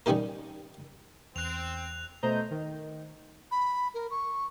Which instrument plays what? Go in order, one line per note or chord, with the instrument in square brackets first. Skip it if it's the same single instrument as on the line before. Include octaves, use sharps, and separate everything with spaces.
[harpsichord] D#3 G3 C#4 D#4 G4 A#4
[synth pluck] E2 [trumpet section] C4 [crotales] F#6 F7
[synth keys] B2 A3 C5 D#5 A#5 G6
D#3
[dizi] B5
A#4
C#6